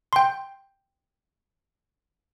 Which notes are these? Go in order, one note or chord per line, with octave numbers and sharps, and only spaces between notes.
G5 C6